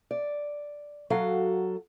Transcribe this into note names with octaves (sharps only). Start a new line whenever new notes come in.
D5
F#3 F#4 A4 F5